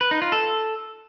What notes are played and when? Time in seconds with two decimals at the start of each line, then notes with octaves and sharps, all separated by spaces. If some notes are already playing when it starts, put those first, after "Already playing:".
0.01 B4
0.11 D#4
0.22 F4
0.32 A4